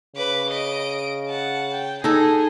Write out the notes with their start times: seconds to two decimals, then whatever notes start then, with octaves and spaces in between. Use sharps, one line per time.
0.16 C#3 B4 D6
0.51 D#5 D7
1.28 F#5 A5
1.74 G5
2.04 D#4 G#4 A4 D#5